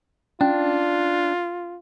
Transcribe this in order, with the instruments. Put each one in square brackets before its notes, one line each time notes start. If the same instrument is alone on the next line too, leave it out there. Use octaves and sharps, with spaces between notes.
[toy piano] C#4 [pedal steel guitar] D4 [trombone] F4